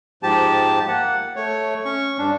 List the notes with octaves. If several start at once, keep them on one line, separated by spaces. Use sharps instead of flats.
G#2 F3 G4 A5
A#3 F#5
A3 C#5
C#4 C#6
G2 D4